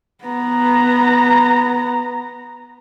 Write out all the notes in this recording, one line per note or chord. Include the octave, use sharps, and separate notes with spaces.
B3 A#5